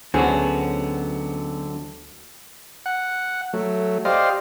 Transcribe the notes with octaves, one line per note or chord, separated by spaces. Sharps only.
D2 D3 F#3 B3 C#4 F#4 G#4 C5
F#5
F#3 A3
G4 C5 D5 D#5 F5